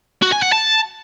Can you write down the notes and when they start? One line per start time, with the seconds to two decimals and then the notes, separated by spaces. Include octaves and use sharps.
0.22 F#4
0.32 G#5
0.42 F#5
0.52 A5